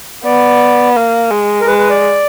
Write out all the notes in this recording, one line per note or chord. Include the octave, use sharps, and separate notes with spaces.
B3 D5
A#3
G#3
A#4
G#3 B4
B4
D5